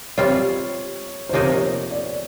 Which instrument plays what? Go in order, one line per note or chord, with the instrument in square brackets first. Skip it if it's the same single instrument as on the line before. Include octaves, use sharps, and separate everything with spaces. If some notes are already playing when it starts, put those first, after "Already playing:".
[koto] G3 C4 F4 [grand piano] C#5
[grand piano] C5
[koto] C3 F3 A#3 D#4 [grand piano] C#5
[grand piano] C#5
D5